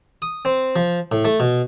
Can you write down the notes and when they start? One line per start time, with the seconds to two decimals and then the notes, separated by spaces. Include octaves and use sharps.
0.22 D#6
0.45 C4
0.76 F3
1.12 A2
1.25 A3
1.40 B2